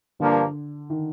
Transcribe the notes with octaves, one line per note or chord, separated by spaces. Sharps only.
G2 D3 F3 A#3 D4
D#3